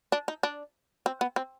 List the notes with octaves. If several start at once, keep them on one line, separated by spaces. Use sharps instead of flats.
D4
D#4
D4
C4
B3
C4